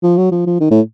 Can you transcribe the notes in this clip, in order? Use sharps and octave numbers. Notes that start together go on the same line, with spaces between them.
F3
F#3
F3
F3
D#3
A2